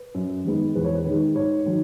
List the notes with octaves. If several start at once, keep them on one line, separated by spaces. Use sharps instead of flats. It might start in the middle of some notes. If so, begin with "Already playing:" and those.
Already playing: B4
F#2
D#3 G#3 B3
E2 B4
C#5
B4
D#3
G#3
G#2 C#5
D#3 F#3